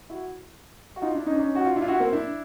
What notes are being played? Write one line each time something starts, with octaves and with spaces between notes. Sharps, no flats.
E4 F#4
F#4
D#4 F4
D4 E4
C#4 D#4
D4
C#4 D#4
F#4
F4
D4 E4
F4
E4 F#4
A#3 C4
D4 E4